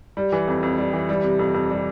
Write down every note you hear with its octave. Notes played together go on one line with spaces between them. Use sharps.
G3
E3
F2
F2
G3
E3
G3
C3
F2
F2
G3